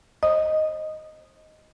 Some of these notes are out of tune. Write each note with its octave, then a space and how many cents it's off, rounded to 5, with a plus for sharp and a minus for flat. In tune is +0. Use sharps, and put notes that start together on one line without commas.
C5 +30 D#5 +0 D#6 -10